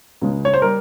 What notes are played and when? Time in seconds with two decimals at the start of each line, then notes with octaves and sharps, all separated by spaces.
0.21 C#2 C#3 G#3
0.45 C#5
0.54 C5
0.62 G3 A#4